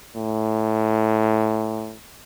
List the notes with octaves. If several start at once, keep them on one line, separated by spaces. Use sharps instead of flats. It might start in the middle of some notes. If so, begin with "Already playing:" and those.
A2